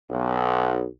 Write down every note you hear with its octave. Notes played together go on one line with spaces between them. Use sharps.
B1